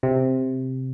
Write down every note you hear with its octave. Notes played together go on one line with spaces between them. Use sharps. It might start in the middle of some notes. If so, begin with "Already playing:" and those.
C3